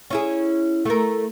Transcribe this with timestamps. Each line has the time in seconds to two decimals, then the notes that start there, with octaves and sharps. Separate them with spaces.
0.10 C#4 E4 G#4
0.85 A3 A#4